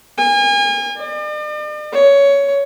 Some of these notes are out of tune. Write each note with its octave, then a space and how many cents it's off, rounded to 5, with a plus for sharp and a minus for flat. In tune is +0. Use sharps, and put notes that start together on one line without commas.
G#5 -35
D5 +45
C#5 +15